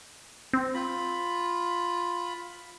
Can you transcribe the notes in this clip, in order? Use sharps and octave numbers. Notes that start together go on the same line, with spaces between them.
C4
F4 B5